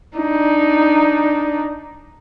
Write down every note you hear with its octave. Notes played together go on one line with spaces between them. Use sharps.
D4 D#4